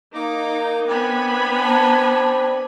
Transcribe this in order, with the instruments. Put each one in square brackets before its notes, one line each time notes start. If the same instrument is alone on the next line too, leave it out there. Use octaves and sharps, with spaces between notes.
[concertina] A#3 D6 [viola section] D#4 [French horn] A#4
[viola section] B3 G#5 B5 [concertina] C4 D4
[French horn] C5 [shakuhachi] A5